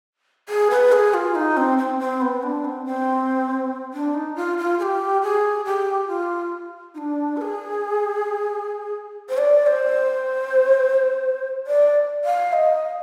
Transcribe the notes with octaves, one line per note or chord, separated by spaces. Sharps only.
G#4
B4
G#4
F4
D#4
C4
C4
C4
B3
D4
C4
C4
D4
D#4
F4
F4
G#4
G4
G#4
G4
F4
D#4
D4
B4
G#4
C5
D5
C5
D5
F5
D#5